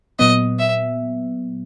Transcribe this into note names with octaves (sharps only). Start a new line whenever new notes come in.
A#2 F#3 B3 D#5
E5